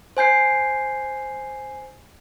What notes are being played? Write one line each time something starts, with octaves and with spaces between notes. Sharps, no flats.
C5 G#5 G6 C7